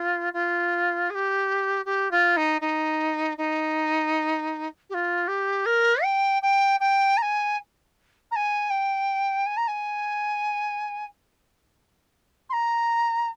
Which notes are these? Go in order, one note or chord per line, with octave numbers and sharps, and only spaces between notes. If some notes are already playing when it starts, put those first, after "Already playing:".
Already playing: F4
F4
G#4
G4
G4
F4
D#4
D#4
D#4
G4
F4
G4
A#4
G5
G5
G5
A#5
G#5
A#5
G#5
G5
G#5
A#5
G#5
C6
A#5